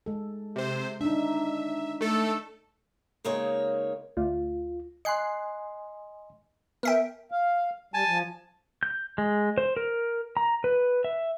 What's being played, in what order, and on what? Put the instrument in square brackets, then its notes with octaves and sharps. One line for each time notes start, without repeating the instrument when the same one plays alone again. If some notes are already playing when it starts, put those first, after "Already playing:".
[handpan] G#3 A4
[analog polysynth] C3 C5
[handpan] D4 D#4 [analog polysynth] E5
[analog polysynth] A3 A4
[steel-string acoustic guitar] C#3 G#3 A#3 D#4 C#5
[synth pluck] D2 [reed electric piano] F4
[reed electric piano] D#5 G#5 C6 [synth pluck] F#6 C7
[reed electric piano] B3 [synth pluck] A#4 E5 G5
[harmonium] F5
[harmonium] G3 [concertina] G#5 A5
[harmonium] F3
[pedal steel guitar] G6
G#3
C5
A#4
A#5
B4
E5